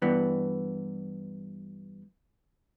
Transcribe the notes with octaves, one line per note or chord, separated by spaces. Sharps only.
G2 E3 B3